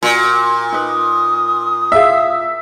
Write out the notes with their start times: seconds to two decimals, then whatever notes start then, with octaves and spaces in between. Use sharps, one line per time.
0.03 A#2 F#4
0.72 D#4 B4 D#6
1.92 E4 G#4 E5 F5